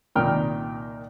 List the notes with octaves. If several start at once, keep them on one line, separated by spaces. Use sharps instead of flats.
C2 A#2 D#3 D#4 G5 F6